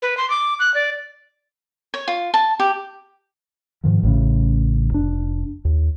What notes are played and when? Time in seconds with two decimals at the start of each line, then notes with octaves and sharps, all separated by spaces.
0.02 B4
0.17 C6
0.30 D6
0.60 F#6
0.74 D5
1.94 C#5
2.08 F4
2.34 A5
2.60 G4
3.84 G#2 D#3 F3
4.03 A1 A2 C#3
4.90 F1 D4
5.65 D#2